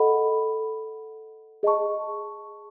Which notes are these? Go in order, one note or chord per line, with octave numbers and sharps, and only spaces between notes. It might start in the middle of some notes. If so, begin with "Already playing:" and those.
Already playing: A4 D#5 F#5 B5
G#4 D#5 A5 C#6